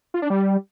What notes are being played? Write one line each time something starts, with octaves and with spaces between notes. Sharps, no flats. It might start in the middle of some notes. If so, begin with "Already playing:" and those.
F4
D4
G3